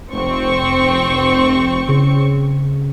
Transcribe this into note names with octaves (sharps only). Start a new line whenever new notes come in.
F1 C4 C#6
C#3